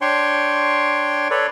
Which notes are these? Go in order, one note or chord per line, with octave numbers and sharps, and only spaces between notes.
D4 C#5 G5 C6 C#6
A4 B4 C#5 D5